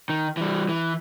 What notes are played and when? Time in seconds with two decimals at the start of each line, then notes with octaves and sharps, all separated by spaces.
0.09 D#3
0.37 E3 G3
0.69 E3